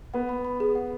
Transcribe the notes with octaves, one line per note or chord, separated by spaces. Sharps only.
B3 F#5
B5
B5
G#4
F#5